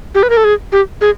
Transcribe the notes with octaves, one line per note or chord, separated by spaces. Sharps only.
G4
B4
A#4
A4
G#4
G4
G#4